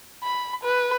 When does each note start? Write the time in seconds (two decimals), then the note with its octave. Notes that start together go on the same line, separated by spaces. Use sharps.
0.23 B5
0.64 B4